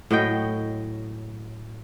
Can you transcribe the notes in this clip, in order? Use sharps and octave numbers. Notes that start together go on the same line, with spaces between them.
A2 F#3 D#5 G5